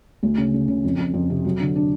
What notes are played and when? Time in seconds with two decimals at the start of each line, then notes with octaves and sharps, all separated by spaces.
0.23 D2
0.38 C#3
0.54 C#3
0.68 C#3
0.84 F2
0.99 F2
1.14 F2
1.30 C3
1.45 F#3
1.60 D3
1.76 D4